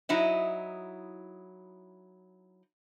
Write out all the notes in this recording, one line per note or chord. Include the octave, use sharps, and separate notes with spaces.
F#3 D#4 E4 D#5